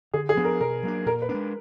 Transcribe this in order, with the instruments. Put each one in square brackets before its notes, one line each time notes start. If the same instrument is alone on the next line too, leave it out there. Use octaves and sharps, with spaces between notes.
[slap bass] D3 [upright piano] G#4
[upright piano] G#4
[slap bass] F3 B3 D4
[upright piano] A#4
[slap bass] B2 [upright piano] A#4
[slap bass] F#3 A#3 D4
[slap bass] A#2 [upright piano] A#4
[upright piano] B4
[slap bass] B3 D4
G#3